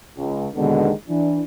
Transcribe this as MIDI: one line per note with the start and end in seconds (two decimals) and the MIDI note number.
0.16 0.47 37
0.56 0.90 39
0.56 0.90 47
0.56 0.90 50
0.56 0.90 51
0.56 0.90 56
0.56 0.90 59
1.08 1.42 52
1.08 1.42 62